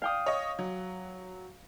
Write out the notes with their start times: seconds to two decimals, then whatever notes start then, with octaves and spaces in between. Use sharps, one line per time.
0.02 F5 G5 D#6
0.26 C#5 D#5
0.59 F#3